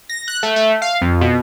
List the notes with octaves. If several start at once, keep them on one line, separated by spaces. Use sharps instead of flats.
A#6
F#6
A3
A3
F5
F2
B2